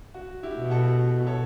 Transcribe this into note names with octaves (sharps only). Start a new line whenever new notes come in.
F#4
E4 G4
B2
F#4 A4
A4 C#5